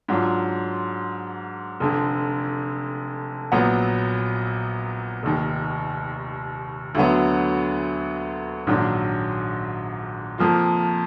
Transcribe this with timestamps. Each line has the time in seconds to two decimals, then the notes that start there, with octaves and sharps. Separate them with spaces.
0.08 G#2 F#3 D4 F4
1.80 F1 F2 D3
3.52 A#1 A#2 F#3 B3
5.23 F1 D#2 D#3
6.95 D2 D3 F#3 B3
8.67 A#1 G#2 D#3 F#3 D4
10.38 F2 F3 A#3 F4